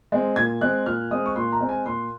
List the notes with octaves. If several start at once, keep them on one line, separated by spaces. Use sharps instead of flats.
G#3 C4
A#2 G#6
G#3 C4 F#6
A#2 F6
G#3 C4 D#6
C#6
A#2 C6
A#5
G#3 C4
G#5
A#2 C6